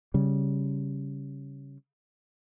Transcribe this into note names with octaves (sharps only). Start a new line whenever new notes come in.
C#3 G3